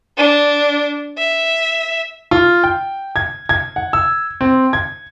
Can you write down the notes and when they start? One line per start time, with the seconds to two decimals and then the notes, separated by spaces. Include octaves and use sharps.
0.18 D4
1.18 E5
2.31 F4
2.64 G5
3.16 G#6
3.49 G#6
3.76 F#5
3.93 E6
4.41 C4
4.73 G#6